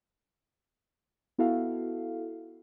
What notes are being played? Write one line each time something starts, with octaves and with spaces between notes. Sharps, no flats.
B3 E4 F#4 A4 F5